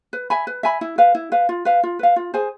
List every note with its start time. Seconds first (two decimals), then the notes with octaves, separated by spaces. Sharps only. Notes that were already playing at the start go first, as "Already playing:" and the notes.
0.13 B4
0.30 E5 G#5 B5
0.47 B4
0.63 E5 G#5 B5
0.81 E4
0.98 B4 F5
1.15 E4
1.32 B4 F5
1.49 F4
1.65 B4 F5
1.83 F4
1.99 B4 F5
2.16 F4
2.34 G#4 C5 G#5